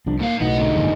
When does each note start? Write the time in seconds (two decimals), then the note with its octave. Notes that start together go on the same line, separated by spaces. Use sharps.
0.06 C2 F3 D4
0.20 G#2 A#3 F5
0.41 B1 A2 F#3 B3 D#4
0.59 G#2 D3
0.76 F#1 D#2 A#2 G#3